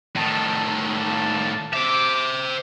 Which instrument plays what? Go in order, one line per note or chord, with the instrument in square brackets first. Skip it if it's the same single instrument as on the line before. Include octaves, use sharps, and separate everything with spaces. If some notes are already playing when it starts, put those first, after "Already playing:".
[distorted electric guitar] A2 D#3 [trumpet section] A5
[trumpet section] D5 F5 A5
[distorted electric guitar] C5 E5 [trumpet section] D6